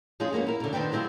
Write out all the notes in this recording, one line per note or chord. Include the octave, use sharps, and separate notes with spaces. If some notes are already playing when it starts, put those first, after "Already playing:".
F3 G#3 C#4 F4 G#4
G3 A#3 B3 C#4
E4 A#4
B2 D3
D#3 C4 D4 B4 G5
F#3 G#3 C4 E4 F4